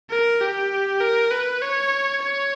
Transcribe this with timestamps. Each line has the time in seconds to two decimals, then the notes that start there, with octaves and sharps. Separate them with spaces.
0.10 A#4
0.41 G4
1.01 A#4
1.31 B4
1.62 C#5
2.22 C#5